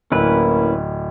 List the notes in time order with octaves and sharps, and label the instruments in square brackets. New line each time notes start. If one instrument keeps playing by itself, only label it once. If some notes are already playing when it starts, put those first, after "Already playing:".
[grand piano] D1 [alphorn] A#3 [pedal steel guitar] C#4 E4 B4